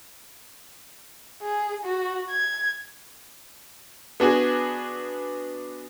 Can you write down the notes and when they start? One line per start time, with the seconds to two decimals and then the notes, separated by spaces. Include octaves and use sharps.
1.43 G#4
1.84 F#4
2.30 G#6
4.20 B3 D4 F#4 G#4